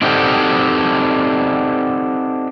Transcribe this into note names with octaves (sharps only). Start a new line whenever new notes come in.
C4 D4 D#4 F#4 G4 A4